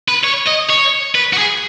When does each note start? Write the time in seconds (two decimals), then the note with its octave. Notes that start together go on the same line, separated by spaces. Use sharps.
0.08 B4
0.23 C#5
0.47 D#5
0.70 C#5
1.15 B4
1.33 F#4
1.38 G#4